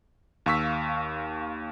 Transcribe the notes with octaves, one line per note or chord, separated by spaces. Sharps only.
D#2 F5 C#6 E6 B6